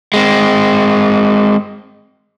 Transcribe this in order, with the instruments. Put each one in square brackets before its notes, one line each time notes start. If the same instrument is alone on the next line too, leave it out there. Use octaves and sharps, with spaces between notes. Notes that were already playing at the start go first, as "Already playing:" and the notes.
[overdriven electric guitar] G#3 C4